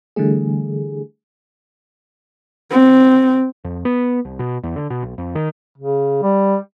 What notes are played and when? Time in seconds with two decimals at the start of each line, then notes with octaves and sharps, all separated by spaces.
0.16 D3 E3 G3 A3 G#4
2.70 C4
3.64 F2
3.85 B3
4.25 C2
4.39 B2
4.63 E2
4.76 D3
4.90 B2
5.03 B1
5.18 F2
5.35 D#3
5.78 C#3
6.23 G3